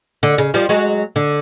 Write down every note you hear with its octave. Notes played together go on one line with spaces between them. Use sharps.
D3
C#3
F3 G3
F#3 G#3
D3